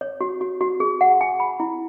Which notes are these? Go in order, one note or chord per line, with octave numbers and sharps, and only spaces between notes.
C#5
F#4
F#4
F#4
G#4
F#5
G#5
B5
E4